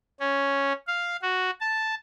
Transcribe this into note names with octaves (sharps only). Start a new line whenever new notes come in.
C#4
F5
F#4
A5